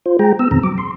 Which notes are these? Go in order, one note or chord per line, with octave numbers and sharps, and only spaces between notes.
F4 C5
G#3 G#4 G5 A#5
B3 E6
F2 B2 D#3 C4 A#5
F#3 D6
C6